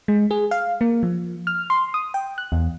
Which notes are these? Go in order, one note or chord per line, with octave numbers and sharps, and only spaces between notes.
G#3
G#4
F5
A#3
F3
F6
C6
D#6
G5
F#6
E2